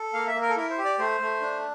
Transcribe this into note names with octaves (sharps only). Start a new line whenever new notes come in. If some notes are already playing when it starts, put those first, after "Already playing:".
Already playing: A4
A#3 F5
E5
A#3
A#4
A4
E4 A#4
C5
G4
D5
A3 C5
A3
D4